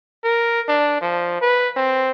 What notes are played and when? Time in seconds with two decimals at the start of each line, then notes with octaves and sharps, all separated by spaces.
0.24 A#4
0.68 D4
1.01 F3
1.41 B4
1.76 C4